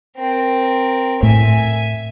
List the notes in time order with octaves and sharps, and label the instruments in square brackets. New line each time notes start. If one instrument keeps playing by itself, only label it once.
[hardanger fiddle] C4 A#4
[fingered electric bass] A2 [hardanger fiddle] E5 G#5